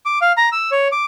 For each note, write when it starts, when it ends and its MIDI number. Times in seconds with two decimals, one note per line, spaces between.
0.06 0.19 86
0.22 0.32 77
0.37 0.49 82
0.52 0.70 88
0.71 0.88 73
0.92 1.05 86